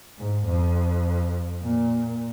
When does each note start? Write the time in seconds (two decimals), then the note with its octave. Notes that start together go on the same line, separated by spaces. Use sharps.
0.18 G#2
0.46 F2
1.63 A#2